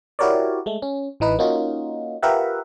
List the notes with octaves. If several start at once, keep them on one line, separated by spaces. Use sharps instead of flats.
E4 F#4 G4 A#4 C#5 D5
G#3 A3
C#4
A1 E3 D#4 B4
A#3 C#4 D#4 F4 F#4
F4 G4 A#4 B4 E5 F#5